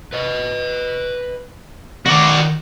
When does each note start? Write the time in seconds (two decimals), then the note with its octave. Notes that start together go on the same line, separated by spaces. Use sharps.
0.13 B4 D#5
2.06 D#3 F#4 D5